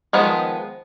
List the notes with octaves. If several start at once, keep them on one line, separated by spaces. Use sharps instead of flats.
D#3 F3 G#3 B3